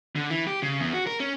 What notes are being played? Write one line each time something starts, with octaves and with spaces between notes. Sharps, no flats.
D3
E3
G4
C#3
E2
F#4
A#4
C#4